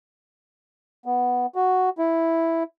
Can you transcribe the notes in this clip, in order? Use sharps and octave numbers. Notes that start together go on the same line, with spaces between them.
B3
F#4
E4